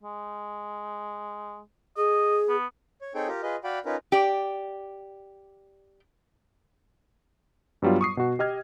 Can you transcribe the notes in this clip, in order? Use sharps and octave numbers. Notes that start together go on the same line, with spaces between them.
G#3
G#4 D#5
B3
C#5
C4 D#4 G#4 A4 C#5 G5
F4 G4 A#4
F4 G#4 B4 D#5
F#4 D5 F5 G5 B5
C#4 D#4 F4 A#4 B4
G4 D5
G2 F#3 G3 B3 F4
C#6 D#6 C7
B2 F#4
G4 D#5 F6 G#6